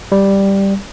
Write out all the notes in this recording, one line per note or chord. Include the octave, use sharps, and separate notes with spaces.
G3